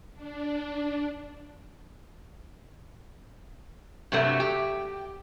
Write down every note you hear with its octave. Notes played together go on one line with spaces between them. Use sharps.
D4
G2 C3 F#3 A3
G4